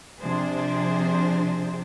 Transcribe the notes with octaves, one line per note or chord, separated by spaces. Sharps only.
C3 F3 D4 G#4 C5